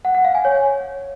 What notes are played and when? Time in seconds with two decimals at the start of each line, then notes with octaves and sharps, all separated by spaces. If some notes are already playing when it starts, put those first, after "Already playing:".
0.05 F#5
0.15 F#5
0.25 F5
0.35 G#5
0.45 C#5